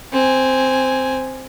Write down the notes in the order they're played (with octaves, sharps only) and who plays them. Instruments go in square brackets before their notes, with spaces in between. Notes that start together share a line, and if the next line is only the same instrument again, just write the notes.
[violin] C4 G#5